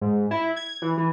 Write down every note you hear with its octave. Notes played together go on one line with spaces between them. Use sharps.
G#2
E4
G#6
E3
E3